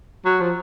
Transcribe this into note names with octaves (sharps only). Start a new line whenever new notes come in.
F#3
F3